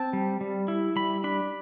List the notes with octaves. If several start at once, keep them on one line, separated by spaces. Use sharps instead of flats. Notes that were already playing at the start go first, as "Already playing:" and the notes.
Already playing: C4 A5
G3
G3
E4
G3 B5
D4 B5